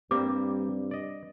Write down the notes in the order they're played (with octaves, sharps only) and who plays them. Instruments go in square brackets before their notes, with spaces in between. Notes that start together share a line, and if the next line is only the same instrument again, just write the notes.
[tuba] G2 [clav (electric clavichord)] G3 A#3 [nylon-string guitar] C4 [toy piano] D6
[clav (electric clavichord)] D5 D#5